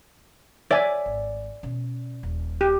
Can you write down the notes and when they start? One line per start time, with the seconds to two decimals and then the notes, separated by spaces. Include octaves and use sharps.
0.71 D5 E5 G#5
1.06 G#1
1.63 B2 C#4
2.23 D#1
2.61 G4